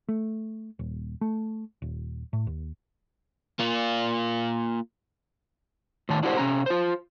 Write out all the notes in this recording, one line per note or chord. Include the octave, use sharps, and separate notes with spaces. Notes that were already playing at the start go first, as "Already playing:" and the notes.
A3
D#1
A3
D#1
A2
D#2
A#3 F4
A2 D#3 A5
D4 E4 F#4 G4 A4 C5
C3 C#4 A#5
F4 C5